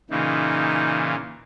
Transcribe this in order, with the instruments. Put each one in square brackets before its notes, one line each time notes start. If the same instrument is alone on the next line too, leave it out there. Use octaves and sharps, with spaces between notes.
[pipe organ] A#2 C#3 E3 [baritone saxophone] D#4